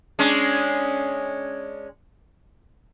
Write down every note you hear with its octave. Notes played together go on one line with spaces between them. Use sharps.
G#3 C#4 D4